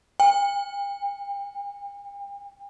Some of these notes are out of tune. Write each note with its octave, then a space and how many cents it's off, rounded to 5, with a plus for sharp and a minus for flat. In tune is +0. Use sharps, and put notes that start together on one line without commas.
G5 +40